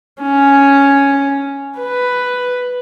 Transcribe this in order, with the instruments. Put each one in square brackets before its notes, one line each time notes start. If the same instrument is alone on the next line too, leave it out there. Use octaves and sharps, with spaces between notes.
[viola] C#4
B4